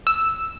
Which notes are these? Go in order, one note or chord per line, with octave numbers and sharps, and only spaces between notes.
E6